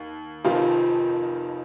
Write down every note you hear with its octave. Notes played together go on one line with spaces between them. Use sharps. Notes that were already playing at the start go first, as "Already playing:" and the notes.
Already playing: D#2
F1 F2 D#3 F3 F4